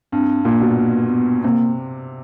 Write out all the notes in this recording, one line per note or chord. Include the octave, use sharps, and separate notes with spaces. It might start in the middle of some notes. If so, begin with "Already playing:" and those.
G2 C4
A#2 A#3
B2
A#3
B3
C3 A#3